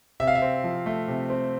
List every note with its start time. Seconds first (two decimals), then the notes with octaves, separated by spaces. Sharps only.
0.20 C3 E5
0.27 F5
0.35 E5
0.42 C4
0.64 F3
0.86 A3
1.08 C3
1.30 C4